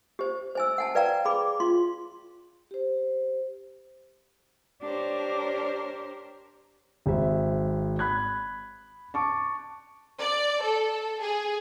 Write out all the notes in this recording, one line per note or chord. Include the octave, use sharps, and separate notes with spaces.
G4 C5
C5 G#5 E6
F#5 G#5 A5
B4 D5 F5 G5 A#5
G#4 B5 D6
F4 C6
G4 C5
D4 G4 A#4 C5 C#5
G#1 G#3 C4 E5
B5 F#6 G#6
A5 C#6 D6
D5
A4
G#4